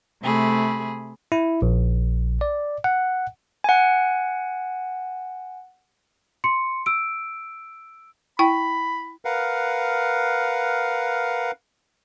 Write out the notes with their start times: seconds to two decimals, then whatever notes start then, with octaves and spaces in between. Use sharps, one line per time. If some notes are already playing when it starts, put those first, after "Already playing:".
0.22 C3 A3 G#4 B5
1.32 E4
1.62 A#1
2.41 D5
2.84 F#5
3.64 F#5 G#5
6.44 C6 C#7
6.86 E6 D7
8.39 E4 G5 B5
9.25 A#4 B4 F5 F#5